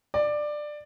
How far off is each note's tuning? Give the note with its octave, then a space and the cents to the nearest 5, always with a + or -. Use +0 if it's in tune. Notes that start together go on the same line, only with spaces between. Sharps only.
D5 +15